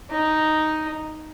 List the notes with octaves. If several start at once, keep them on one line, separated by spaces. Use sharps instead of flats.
D#4